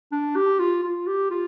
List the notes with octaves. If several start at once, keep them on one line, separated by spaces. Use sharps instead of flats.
D4
G4
F4
F4
G4
F4